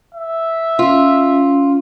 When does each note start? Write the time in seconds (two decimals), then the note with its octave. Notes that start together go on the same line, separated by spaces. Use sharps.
0.15 E5
0.79 C#4 F4